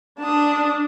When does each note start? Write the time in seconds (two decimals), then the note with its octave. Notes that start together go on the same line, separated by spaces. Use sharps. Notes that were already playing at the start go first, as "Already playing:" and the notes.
0.20 D4 A5 D#6